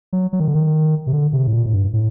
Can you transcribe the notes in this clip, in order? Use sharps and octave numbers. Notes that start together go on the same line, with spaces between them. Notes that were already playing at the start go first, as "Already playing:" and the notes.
F#3
F#3
D#3
D3
D#3
C3
D3
C3
A2
A#2
A2
G2
A2